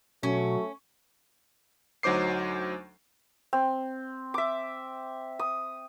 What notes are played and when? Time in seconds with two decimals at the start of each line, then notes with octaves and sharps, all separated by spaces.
0.23 B2 F#3 A3 C#4
2.03 D2 F#3 D#4 C5 D6 C7
3.53 C4
4.34 E5 D6
5.39 D#6